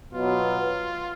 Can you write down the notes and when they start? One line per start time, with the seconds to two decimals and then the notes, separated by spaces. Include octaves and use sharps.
0.13 B2 F#3 B3 F4